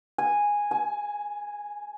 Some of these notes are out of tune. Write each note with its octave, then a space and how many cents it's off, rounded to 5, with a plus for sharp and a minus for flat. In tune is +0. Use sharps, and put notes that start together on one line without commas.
G#5 -10
G#5 +25